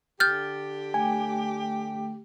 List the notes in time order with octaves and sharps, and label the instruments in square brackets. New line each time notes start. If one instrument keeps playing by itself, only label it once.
[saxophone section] D3 G4 [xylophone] F6 G6 [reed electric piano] A6
[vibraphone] A3 G5 [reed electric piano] G#5